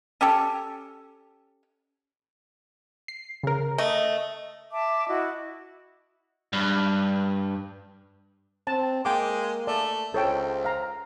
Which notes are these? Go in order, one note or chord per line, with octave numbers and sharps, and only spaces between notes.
C#4 G4 A4
C7
C#3 A#4
A3 D#5
E5 A5 D6
E4 F#4 D#5
G2
C4 A5
G#3 A#3 G5 D6
A3 D5
C#2 A4 C5 C#5 G5
F5 A#5